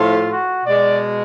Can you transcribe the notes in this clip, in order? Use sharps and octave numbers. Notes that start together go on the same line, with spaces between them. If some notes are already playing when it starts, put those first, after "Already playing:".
Already playing: A2 F3 A3 F4
F#4
B2 G#3 D5